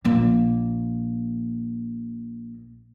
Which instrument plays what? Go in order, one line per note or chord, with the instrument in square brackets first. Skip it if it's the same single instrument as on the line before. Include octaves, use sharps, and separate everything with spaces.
[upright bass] A#1 A#3